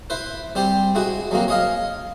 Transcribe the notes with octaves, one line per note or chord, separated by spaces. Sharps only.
E4 B4 C5
G3 C4 G4 C5
G#3 E4 F#4
F#3 G#3 A#3 C4
C#5 D#5 F5